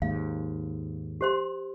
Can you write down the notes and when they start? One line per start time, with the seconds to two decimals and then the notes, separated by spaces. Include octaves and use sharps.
0.02 D#2 G#2 F5
1.21 G4 C5 C6